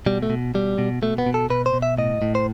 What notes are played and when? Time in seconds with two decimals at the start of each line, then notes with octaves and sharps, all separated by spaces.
0.06 B2 G3
0.22 A3
0.30 B2
0.54 B2 G3
0.78 B2
1.02 B2 A3
1.18 B3
1.26 B2
1.34 A4
1.50 B2 B4
1.66 C5
1.73 B2
1.82 E5
1.98 A2 D#5
2.22 A2
2.35 C5